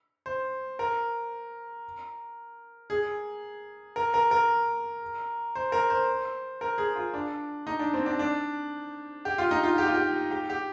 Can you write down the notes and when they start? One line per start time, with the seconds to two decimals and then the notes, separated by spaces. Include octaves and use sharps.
0.26 C5
0.79 A#4
2.90 G#4
3.96 A#4
4.14 A#4
4.31 A#4
5.55 C5
5.72 A#4
5.90 C5
6.61 A#4
6.78 G#4
6.96 F4
7.14 D4
7.67 D#4
7.79 D4
7.94 C4
8.06 D4
8.19 D4
9.25 G4
9.38 F4
9.51 D#4
9.64 F4
9.78 G4
9.86 F4
9.94 G4
10.31 G4
10.50 G4